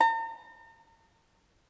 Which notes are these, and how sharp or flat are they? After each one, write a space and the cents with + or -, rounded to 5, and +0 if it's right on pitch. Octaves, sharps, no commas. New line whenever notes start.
A#5 -45